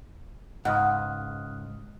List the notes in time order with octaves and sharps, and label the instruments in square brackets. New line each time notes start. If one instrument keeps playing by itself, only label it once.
[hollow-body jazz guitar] C#2 G#2 [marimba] F#5 [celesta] D#6 F6 F#6